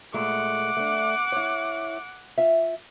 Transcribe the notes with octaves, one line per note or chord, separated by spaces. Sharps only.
A#2 G#3 A3 F#5 D6
A3 D4
E4 C#5
F4 E5